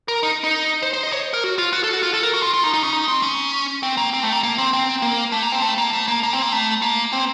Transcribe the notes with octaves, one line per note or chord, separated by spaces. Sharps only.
A#4
D#4
D#4
C5
C5
D#5
C#5
A#4
F#4
F4
F#4
A4
F#4
F4
A4
A#4
F#4
F4
F4
D#4
D#4
C#4
D#4
C4
C#4
C4
A#3
C4
A3
A#3
A#3
C4
C4
A#3
A3
A#3
C4
A3
A#3
A3
A#3
A#3
C4
A#3
A3
A#3
C4